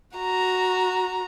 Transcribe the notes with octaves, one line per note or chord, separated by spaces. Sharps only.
F#4 A#5